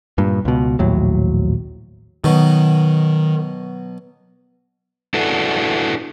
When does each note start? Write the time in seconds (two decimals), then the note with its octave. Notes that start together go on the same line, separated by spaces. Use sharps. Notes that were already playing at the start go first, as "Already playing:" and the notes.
0.18 G2 A#2
0.45 C#2 B2
0.79 A#1 D#2 A2 F#3
2.24 B2 D#3 F#3
5.14 D4 E4 F#4 A4 B4